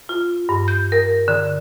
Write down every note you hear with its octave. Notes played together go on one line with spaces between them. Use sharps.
F4
G2
G6
A#4
D3